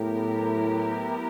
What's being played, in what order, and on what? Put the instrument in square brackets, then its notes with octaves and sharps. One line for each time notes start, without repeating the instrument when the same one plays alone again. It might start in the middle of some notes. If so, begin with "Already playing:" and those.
Already playing: [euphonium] A2 [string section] F#3 B3 E4 G4 A#4